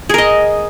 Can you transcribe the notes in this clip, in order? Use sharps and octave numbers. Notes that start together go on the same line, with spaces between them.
G#4 A#4 D#5